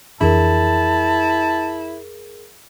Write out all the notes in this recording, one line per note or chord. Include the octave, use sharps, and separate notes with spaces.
F2 E3 D4 E4 G#4 A#4 A5